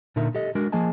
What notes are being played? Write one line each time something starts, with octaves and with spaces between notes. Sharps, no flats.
A#2 D3 D#4 A#4 E5
G4 A4 D#5
G#3 D4 F#4 A#4
F3 A#3 G#4 D#5 G#5 A5